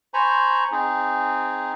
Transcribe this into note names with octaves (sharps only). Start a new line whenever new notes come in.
C5 G#5 A#5 B5 C#6
C4 D#4 G#4